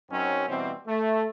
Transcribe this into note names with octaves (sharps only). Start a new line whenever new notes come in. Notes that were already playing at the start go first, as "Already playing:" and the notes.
F#2 F#3 C4 C#4 D#4
B2 E3 G3 C4
A3